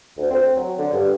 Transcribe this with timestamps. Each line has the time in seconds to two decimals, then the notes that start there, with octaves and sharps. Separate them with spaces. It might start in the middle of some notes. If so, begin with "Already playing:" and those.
0.18 D2
0.30 C4
0.57 F#3
0.78 D3
0.93 G2